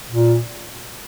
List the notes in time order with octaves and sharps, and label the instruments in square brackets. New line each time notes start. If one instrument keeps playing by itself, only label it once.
[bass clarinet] A#2